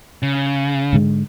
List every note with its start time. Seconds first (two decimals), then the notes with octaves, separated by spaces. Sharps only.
0.23 C#3
0.93 G#2 D3 G#3